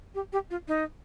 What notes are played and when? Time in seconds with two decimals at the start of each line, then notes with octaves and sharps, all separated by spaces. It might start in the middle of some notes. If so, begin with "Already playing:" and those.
0.15 G4
0.33 G4
0.50 F4
0.68 D#4